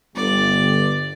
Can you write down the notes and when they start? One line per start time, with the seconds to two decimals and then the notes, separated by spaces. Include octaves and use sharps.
0.16 G1 D5